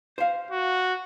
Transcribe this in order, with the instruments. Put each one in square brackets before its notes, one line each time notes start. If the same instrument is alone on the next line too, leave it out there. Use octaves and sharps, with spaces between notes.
[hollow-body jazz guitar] C5 F5
[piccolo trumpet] F#4